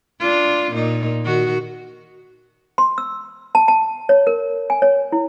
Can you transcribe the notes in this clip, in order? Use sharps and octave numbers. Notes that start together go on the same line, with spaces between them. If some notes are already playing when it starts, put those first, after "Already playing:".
D4 F4
A#2 D#4
D#3 F#4
C6
E6
A5
A5
C#5
A#4
G#5
C#5
E4